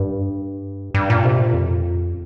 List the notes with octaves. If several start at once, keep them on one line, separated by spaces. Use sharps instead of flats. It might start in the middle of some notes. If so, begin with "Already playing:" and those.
Already playing: G2
G2
A#2
C3
A#2
F2